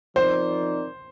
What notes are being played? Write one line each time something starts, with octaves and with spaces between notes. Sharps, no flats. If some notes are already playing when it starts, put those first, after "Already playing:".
F3 C4 D#4 A#4 C5 D5